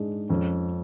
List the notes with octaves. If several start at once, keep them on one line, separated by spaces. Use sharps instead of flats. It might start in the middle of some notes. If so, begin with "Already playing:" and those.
Already playing: G#2 G#3 D4
F2 C#4